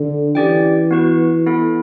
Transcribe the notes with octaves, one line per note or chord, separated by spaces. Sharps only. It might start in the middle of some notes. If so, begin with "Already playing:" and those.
Already playing: D3
E3 C#4 G4 D5 G5
B3 F#4 B4
B3 E4 A4